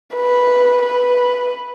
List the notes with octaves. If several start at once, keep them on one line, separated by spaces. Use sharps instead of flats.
B4
B4